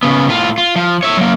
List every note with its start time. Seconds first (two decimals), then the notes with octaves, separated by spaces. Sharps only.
0.03 C#3 B3
0.28 A2 F4
0.58 F4
0.76 F3
1.03 C#5 E5
1.17 F#3 A#3